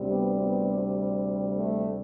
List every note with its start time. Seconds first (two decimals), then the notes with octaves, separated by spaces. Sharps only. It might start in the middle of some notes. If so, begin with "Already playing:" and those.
Already playing: D2 C3 G3
0.08 B3
0.38 B3
1.57 A3